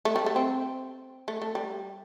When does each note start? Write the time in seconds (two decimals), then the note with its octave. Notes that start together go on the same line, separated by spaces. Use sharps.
0.05 A3
0.16 G3
0.26 A3
0.36 C4
1.28 A3
1.42 A3
1.55 G3